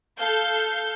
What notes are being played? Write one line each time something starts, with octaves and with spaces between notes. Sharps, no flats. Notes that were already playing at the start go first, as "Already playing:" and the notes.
A4 F5 G6